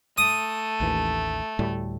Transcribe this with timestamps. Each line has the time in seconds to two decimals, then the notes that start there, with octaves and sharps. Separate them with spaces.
0.18 A3 D#6
0.80 A1 D#2 E3
1.59 D2 A2 G3